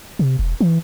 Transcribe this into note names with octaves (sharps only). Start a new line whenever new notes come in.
C3
E1
E3